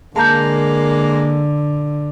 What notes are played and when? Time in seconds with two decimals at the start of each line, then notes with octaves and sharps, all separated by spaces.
0.16 D3 G#3 A#3 A5 A#5 G6